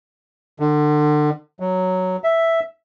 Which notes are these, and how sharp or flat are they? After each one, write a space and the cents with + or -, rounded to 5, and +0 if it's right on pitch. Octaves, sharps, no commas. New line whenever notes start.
D3 +35
F#3 +0
E5 +0